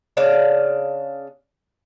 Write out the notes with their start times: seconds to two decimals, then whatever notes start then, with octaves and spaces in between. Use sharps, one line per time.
0.17 C#3 D4 D5 F5